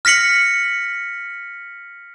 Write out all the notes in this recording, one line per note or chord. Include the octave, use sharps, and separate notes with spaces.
F6 A#6 B6 C#7 F#7